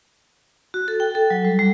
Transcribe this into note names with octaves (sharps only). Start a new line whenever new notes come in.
F#4
A4
G5
A4
F#3
G3
G3